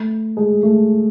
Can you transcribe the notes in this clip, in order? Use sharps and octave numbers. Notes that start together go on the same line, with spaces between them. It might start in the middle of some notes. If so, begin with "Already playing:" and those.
Already playing: A3
G#3
A3